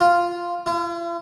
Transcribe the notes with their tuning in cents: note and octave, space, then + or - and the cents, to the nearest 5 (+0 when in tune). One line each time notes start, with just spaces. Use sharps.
F4 -5
F4 -45